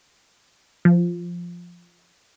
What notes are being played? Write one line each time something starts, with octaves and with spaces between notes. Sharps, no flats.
F3